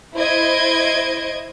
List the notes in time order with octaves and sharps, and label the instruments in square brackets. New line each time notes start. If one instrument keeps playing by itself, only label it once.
[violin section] E4 C5 D#5 G#6 D7